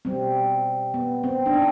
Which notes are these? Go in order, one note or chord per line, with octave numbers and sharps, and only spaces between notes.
B2 G3 C4
B3
C4
D4
D#4